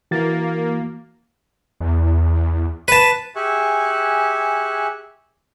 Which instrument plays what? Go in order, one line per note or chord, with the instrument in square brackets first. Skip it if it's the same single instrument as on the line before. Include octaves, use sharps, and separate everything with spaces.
[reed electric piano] E3 F#4 A6 [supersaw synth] A#3
[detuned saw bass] E2
[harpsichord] B4 A5
[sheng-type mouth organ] G4 G#4 E5 G#5 C#6 F#6